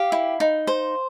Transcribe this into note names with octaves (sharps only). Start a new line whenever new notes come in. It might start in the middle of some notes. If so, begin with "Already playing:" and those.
Already playing: G4 F5
E4
D#4
C5